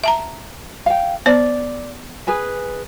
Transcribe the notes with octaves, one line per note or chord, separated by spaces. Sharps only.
E5 A5 A#5
F5 G5
B3 C5 D5
G#4 B4 G#5